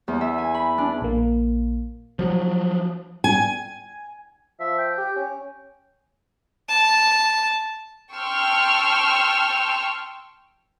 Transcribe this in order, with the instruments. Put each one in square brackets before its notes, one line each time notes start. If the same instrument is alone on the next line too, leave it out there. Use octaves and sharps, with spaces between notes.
[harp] E2
E5
G#5
B5
D4
[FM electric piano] A#1 A#3
[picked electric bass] F3 F#3
[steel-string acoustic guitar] G#5
[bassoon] F3 [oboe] E5
[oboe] G5
[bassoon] G4
C#4
[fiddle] A5
[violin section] G5 A5 C6 C#6 E6 F6